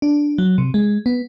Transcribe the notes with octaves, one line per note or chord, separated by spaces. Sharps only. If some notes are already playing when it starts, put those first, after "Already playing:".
D4
F#3
C3
G#3
B3